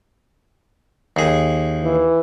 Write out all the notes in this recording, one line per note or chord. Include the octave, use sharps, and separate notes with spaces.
D#2 G#4
E3